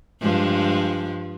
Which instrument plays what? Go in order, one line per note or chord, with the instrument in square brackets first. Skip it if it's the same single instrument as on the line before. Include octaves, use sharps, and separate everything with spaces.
[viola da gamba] G2 F3 G#3